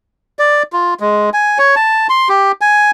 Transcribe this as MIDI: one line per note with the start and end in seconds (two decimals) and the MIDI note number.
0.39 0.63 74
0.73 0.94 65
1.00 1.30 56
1.34 1.58 80
1.58 1.75 73
1.76 2.07 81
2.09 2.29 84
2.29 2.52 67
2.61 2.91 80